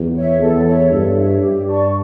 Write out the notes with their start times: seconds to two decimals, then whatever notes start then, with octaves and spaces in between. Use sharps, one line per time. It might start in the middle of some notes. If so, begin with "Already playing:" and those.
Already playing: E2
0.15 C#5 E5
0.41 E2 A4
0.67 C#5 E5
0.91 G2 A4
1.16 C#5 E5
1.41 G2 G4
1.67 D5 A5 C#6